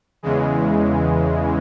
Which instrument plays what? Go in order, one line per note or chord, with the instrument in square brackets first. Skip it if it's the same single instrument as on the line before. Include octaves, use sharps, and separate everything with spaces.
[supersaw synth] E2 C#3 E3 G#3